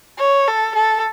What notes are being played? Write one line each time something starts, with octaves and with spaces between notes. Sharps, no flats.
C#5
A4
A4